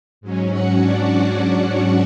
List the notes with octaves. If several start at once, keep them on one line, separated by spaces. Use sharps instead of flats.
G#2 F#3 C#4
F#4 F#5
D4 D5